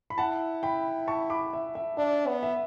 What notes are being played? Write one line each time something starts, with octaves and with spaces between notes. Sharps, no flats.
B5
E4 F#5 A5
G5 B5
A5 C#6
B5 D6
E5
E5
D4 E5
B3
E5